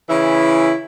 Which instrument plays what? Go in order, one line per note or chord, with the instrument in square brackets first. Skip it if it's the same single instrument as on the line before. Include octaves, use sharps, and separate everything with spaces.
[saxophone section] C#3 E3 E4